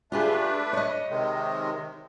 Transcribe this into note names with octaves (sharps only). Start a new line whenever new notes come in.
A3 D4 F4 G4 G#4 B4
C#5 D#5
C3 D#3 G#3